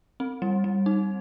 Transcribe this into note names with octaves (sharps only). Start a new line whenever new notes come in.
C4
G3
G3
D#4